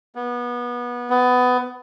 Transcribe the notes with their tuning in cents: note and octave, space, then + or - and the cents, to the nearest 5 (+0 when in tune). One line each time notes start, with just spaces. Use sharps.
B3 -25
B3 +20